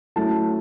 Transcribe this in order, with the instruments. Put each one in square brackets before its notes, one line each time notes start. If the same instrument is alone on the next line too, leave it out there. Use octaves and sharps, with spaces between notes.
[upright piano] F#3 A3 C#4 E4 A5